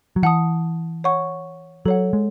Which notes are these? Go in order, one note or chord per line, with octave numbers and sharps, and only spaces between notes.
F#3
E3 F#5 A5 D#6
C#5 F#5 C#6
F#3 A4 C#5 F#5
G#3